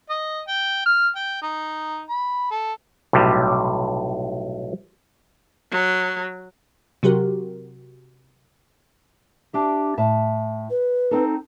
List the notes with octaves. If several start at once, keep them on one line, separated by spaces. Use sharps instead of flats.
D#5
G5
F6
G5
D#4
B5
A4
B1 A2 C3 G3
F#3
C3 F#3 F#4 G4 A#4
D4 G4 E5
A2 E5 A5
B4
C4 D#4 A4